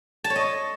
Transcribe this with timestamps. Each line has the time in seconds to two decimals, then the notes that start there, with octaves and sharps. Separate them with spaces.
0.24 A5
0.30 C#5
0.36 D#5